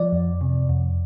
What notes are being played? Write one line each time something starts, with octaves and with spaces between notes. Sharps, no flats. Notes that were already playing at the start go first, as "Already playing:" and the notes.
Already playing: F3 D5
F2
C3
F2